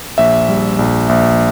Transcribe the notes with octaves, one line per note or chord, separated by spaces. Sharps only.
A#1 E5
G3
A#1
A#1